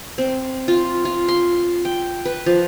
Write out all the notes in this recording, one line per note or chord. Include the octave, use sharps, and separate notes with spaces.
C4
F4
F4
C6
G5
B4
F3